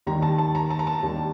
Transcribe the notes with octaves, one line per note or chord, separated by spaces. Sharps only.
D#2 D#3 G3 A#5
A5
A5
A#5
A5
A#5
A5
D#2 D#3 G3